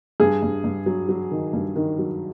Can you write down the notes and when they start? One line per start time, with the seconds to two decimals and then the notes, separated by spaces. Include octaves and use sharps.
0.20 G2 G#4
0.42 G2
0.64 G2
0.86 F#3
1.09 F#3
1.31 D#3
1.53 G2
1.76 D#3
1.99 F#3